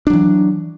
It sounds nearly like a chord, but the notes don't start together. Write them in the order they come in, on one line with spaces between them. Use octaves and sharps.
D4 F#3 E3